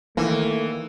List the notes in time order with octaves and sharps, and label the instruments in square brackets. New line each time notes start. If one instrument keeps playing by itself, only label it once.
[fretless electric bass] D#3 A#3 [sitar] E3 [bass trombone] A3